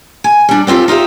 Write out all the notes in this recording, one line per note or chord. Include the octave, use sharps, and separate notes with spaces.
G#5
G3 D4
B3 C4 F4 G4 A4
D#4 F4 G4 E5